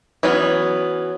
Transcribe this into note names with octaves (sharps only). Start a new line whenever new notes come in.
E3 F#3 B3 C#4